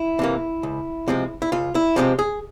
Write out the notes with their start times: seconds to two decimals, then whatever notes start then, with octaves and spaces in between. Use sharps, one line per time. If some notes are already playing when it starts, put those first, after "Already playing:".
Already playing: E4
0.19 C3 E3 A#3
0.63 C#2
1.08 C3 F3 G#3 C4
1.42 E4
1.52 C#2 F4
1.75 E4
1.96 C3 F3 G#3 C4 G4
2.19 G#4